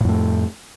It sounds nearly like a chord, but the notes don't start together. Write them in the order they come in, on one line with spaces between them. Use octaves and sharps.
A2 F2 A3